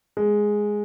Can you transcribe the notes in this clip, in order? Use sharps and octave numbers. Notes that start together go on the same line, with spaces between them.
G#3